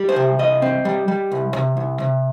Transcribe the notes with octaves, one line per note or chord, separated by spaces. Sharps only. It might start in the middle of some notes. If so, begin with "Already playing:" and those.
Already playing: G3
C5
C3
C2 D#5
C4
G3
G3
C2
C3
C2
C3